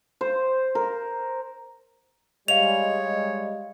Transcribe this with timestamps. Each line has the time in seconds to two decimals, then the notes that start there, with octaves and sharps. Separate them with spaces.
0.21 C5
0.75 A#4
2.48 G3 G#3 C#5 D#5 F5 F7